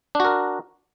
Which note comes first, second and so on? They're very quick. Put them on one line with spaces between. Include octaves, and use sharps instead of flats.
D4 F#4 A#4